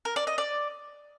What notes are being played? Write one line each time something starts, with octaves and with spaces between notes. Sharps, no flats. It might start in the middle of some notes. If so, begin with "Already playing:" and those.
A#4
D5
D#5
D5